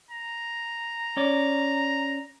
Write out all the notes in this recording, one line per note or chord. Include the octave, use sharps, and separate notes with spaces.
A#5
C#4 C#5 D5